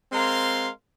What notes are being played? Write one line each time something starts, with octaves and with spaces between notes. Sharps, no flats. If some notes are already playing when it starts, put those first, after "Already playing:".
G#3 C4 A#4 F5 C6